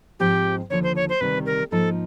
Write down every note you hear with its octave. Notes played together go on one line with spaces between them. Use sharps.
G#2 F3 G#3 C4 G4
D#2 D3 F3 C#5
C5
C#5
C5
D2 C3 D#3 G3 B4
A#4
G#2 F3 A#3 D#4 A4